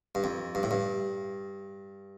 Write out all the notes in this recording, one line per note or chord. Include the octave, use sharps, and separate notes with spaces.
G2
F2
G2
A2
G2